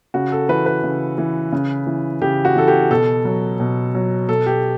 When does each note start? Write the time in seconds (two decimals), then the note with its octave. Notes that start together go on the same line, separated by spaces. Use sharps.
0.14 C#3 F#4
0.32 A4
0.49 E3 B4
0.66 B4
0.84 C#3
1.18 E3
1.52 C#3
1.87 E3
2.21 C#3 G4
2.45 F#4
2.56 E3 A4
2.68 G4
2.91 B2 A4
3.25 F#3
3.60 B2
3.95 F#3
4.29 B2 A4
4.46 G4